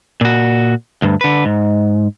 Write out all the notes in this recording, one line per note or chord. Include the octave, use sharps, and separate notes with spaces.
A#2 F#4
D2 G2
D3 B4
G#2